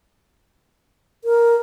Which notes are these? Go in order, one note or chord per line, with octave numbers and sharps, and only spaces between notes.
A#4